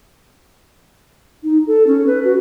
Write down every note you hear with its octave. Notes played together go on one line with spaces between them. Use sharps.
D#4
A4
C#4
B4
F#4